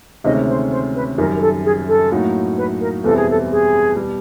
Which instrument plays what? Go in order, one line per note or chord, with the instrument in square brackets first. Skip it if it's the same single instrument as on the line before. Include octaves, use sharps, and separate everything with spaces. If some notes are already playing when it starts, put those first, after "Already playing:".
[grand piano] D2 C3 D#3 G#3 C#4 [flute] D#5
[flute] C5
C5
B4
[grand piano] F#1 F#2 D#3 G3 [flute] A#4
[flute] A#4
A4
G#4
A4
[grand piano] A2 F#3 A#3 D#4 F#4
[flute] B4
A#4
[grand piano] E2 B2 G3 C4 E4 [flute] A4
[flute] G#4
A4
G#4
[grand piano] B2 G3